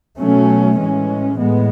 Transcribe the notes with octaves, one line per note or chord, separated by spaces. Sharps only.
B2 F#3 A3 C#4
A2 E3 G#3 C#4
A2 G#3 B3